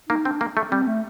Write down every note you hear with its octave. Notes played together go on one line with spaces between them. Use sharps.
A#3 D#4
C4 D4
A#3
A3
G3 C4
A3